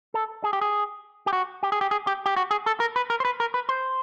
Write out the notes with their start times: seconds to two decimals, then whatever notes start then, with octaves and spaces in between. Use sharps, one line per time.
0.14 A4
0.44 G#4
0.53 G4
0.61 G#4
1.26 G4
1.33 F#4
1.63 G4
1.72 G#4
1.81 G4
1.91 G#4
2.07 G4
2.26 G4
2.36 F#4
2.51 G#4
2.66 A4
2.80 A#4
2.96 B4
3.10 A#4
3.20 C5
3.25 B4
3.40 A#4
3.54 B4
3.69 C5